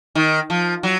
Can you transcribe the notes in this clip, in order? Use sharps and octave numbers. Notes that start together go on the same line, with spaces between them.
D#3
F3
F#3